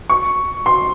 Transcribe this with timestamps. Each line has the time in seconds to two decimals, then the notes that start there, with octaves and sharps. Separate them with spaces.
0.10 C#6
0.66 C6